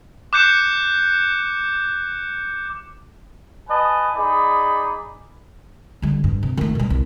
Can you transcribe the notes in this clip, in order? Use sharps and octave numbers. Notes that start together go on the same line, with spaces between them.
D6 F#6 G6 C#7 E7
B4 D#5 G#5 A5
D#4 G#4 D5 B5
D3 G3
G2
C3
D#3 A3
B2 G3
C2